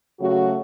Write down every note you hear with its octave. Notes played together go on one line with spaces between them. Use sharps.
C#3 F#3 A3 C#4 F#4